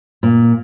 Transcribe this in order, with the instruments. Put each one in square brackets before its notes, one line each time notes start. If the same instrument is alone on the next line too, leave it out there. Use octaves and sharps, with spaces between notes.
[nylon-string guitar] A#2